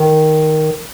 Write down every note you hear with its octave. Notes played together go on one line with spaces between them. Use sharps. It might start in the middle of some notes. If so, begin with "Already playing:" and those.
Already playing: D#3